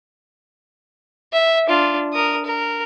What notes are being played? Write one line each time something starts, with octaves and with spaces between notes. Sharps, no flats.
E5
D4 F4
A#4 D#6
A#4